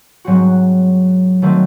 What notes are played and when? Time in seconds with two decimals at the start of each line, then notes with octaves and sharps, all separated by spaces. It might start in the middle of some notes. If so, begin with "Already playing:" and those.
0.24 G#2 F#3 C4 F#4
1.42 D#3 F#3 A3 C4